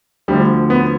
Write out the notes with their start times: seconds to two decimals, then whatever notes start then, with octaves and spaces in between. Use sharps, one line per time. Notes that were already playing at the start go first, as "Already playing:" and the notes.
0.28 D2 D3 F3 G3
0.70 B3